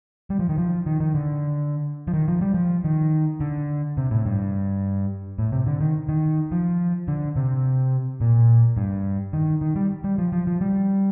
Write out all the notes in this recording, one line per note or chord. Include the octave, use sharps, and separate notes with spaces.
G3
F3
D#3
F3
D#3
D#3
D3
F3
D#3
F3
G3
F3
D#3
D3
C3
A2
G2
A2
C3
D3
D#3
D#3
F3
D3
C3
A#2
G2
D#3
D#3
G3
G3
F3
F3
F3
G3